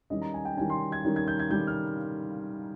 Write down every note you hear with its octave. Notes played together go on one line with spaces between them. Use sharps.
D#3 G3 C#4 D#5
A#5
G#5
G5
D#3 G3 C#4 G#5
C6
G#6
D#3 G3 C#4
G#6
G6
G#6
D#3 G3 C#4 G6
F6